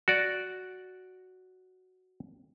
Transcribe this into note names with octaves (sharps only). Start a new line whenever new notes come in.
F#4 D5